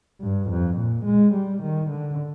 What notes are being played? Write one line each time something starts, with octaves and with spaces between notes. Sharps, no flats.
G2
F2
A#2
G#3
G3
D#3
D3